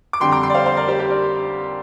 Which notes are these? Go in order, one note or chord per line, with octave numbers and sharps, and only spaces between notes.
D6
F2 D3 G3 G5 C6
A#5 D6
G5 C6
D5
C5 F5
C5 F5
A#4 D5
G4 C5
G4 C5
A#4 D5